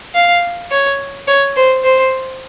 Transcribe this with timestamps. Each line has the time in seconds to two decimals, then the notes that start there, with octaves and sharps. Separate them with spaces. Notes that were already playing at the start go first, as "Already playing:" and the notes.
0.15 F5
0.71 C#5
1.28 C#5
1.56 C5
1.84 C5